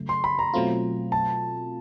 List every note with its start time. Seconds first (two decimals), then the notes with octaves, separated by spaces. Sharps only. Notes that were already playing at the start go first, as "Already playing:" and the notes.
Already playing: C#3 F#3 A3
0.09 C6
0.24 B5
0.39 A#5
0.54 B2 F#3 A3 C4 F4
1.12 A5